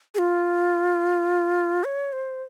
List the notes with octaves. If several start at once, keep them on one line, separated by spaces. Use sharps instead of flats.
G#4
F4
C#5
C5